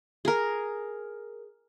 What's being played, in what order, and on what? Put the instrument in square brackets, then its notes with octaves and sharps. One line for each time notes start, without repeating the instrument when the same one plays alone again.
[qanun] G#4 A#4